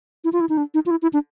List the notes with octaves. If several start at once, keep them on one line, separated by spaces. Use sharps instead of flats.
E4
F4
E4
D#4
D4
D#4
F4
E4
E4
D4